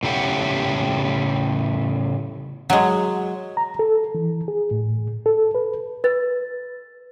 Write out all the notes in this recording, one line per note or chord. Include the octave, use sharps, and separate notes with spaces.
A2 C#3 E4 G4 F#5
F#3 G#3
A#5
A4
E3
G#4
A2
A4
B4
B4 A6